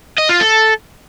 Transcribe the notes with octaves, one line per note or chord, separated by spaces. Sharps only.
D#5
F4
A4